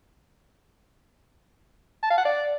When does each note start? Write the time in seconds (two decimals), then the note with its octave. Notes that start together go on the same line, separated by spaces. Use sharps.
2.03 A5
2.10 F5
2.18 F#5
2.25 D5